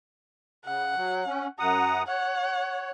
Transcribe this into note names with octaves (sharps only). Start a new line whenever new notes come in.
C#3 F#5
F#3
C#4
F#2 F#5 A#5 D#6
C#5 F#5